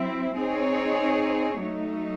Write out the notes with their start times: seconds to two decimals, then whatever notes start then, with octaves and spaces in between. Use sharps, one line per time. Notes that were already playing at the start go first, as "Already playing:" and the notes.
Already playing: F#3 C4 E4
0.38 C4 D#4 G#4 C#5
1.58 F#3 A3 D#4